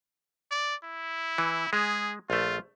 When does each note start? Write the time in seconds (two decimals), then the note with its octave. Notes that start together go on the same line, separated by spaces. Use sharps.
0.51 D5
0.84 E4
1.38 E3
1.73 G#3 G#4
2.30 A#1 A3 F4